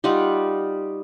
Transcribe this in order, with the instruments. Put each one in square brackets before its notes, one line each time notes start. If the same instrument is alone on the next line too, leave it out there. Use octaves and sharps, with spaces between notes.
[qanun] G3 D#4 F4 F#5